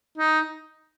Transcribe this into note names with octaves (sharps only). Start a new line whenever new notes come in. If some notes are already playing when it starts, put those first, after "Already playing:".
D#4